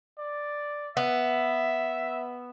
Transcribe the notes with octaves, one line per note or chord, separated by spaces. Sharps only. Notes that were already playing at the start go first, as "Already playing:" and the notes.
D5
B3 E5